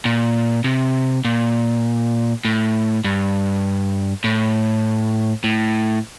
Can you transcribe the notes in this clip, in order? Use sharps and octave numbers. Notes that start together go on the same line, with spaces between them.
A#2
C3
A#2
A2
G2
A2
A2